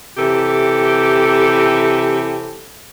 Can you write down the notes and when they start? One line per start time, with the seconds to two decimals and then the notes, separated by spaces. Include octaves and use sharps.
0.17 C3 E3 G4 A4